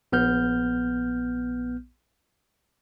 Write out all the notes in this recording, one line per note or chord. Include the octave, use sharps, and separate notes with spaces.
A#1 B3 F6 G6